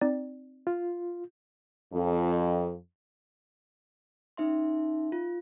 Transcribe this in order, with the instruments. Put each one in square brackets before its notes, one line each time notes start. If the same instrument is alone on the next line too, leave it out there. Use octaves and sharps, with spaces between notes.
[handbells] C4 D#4 D5
[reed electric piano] F4
[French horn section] F2
[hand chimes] C#4 D#4 E5 C6
F4